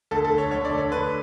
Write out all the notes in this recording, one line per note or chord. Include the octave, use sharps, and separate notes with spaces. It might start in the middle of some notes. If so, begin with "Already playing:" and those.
D2 A4
A4
D3
C#5
D2 C#5
D5
D3
C#5
D2 B4